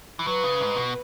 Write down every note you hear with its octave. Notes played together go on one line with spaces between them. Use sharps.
E3
F#3 B4
C#3
G#2
B2